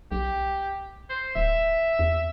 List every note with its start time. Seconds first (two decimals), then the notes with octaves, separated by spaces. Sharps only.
0.12 B1 G4
1.10 C5
1.36 D1 E5
1.99 E2